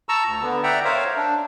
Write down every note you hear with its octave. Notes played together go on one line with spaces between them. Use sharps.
A5 A#5 C#6 E6
D2
D3 B3
D5 E5 F#5 G5 A#5
A#4 C5 C#5 E5 F5
D4